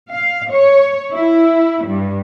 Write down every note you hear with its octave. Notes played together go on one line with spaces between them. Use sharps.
F5
C#5
E4
G2